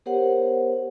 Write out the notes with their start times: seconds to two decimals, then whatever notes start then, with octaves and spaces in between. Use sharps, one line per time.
0.06 B3 G4 A#4 C5 C#5 F#5